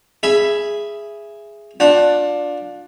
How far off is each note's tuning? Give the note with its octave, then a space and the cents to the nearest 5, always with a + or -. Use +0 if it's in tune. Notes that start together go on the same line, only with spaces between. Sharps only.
G#4 +0 E5 +15 B5 +0
D4 +0 F4 +30 F#5 +0